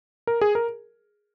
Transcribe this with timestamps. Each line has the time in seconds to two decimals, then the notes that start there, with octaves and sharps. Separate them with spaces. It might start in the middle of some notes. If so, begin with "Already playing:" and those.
0.27 A#4
0.41 G#4
0.55 A#4